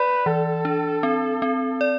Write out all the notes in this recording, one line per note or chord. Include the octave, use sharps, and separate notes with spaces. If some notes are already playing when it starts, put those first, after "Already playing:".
Already playing: B4 D5
E3 A4
D4
C4
C4
D5